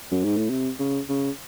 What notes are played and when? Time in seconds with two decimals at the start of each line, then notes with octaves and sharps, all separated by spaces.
0.11 F#2
0.24 G#2
0.37 A2
0.50 C3
0.79 C#3
1.09 C#3